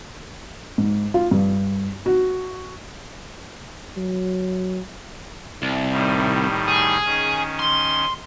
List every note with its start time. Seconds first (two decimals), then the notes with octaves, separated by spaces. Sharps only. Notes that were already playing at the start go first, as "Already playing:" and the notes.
0.78 G#2
1.14 F4
1.31 G2
2.06 F#4
3.97 F#3
5.62 C2
5.91 A2 D#3 G3
6.68 G#4
7.04 D#3 C#4
7.60 C6